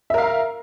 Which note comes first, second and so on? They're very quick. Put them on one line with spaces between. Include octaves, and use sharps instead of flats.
E5 A#4 F5 A#5